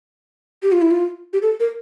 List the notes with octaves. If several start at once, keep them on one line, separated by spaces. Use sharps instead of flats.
G4
F4
E4
F4
G4
A4
A#4